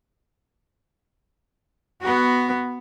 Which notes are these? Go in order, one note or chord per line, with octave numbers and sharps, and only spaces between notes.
B3 F#4